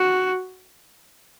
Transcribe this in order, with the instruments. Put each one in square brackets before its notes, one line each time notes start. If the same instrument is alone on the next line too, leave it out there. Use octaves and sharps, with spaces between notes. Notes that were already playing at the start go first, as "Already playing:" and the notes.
Already playing: [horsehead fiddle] F#4